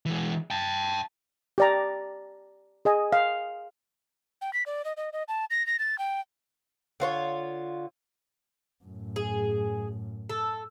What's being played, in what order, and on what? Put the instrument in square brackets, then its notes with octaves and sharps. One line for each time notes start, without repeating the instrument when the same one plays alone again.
[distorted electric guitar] E3 G#3
G5 A5
[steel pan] G4 D5 A#5
G#4 D#5 G#5
F5
[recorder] G5
B6
D5
D#5
D#5
D#5
A5
A#6
A#6
A6
G5
[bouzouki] D3 F4 C5 C#5
[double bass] F#2 A2
[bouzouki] G#4
A4